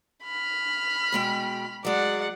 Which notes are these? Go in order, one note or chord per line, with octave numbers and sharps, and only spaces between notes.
B5 F6
B2 G#3 G5
F#3 G#3 D5 F#5